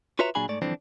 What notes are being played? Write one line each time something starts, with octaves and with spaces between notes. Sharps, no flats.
F4 F#4 B4 C#5 E5 A#5
A#2 F#3 D4 G#4 G#5 B5
G#2 A3 D5
G2 D3 E3 F3 C4 D4